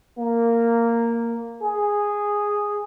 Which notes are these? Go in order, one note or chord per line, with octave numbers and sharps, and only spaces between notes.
A#3
G#4